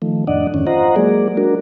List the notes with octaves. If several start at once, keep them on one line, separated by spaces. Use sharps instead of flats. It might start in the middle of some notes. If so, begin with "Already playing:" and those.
D#3 F3 A3
F2 A2 D4 D5 D#5 F#5
F2 G#2 D3 D#3 C#4
F4 C5 D#5 F#5 A#5
F#3 G#3 A#3 G#4 D5
D4 F#4 A#4